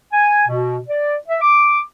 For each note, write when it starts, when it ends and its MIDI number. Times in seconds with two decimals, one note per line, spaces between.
0.13 0.43 80
0.48 0.78 47
0.89 1.15 74
1.28 1.40 76
1.41 1.80 86